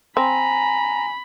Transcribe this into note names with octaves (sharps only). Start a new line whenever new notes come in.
C4 G#5 A#5 B5